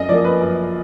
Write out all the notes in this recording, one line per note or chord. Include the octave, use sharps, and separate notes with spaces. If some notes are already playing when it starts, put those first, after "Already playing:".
Already playing: F#2 D#5
F3 A#3 D5
B4
F#2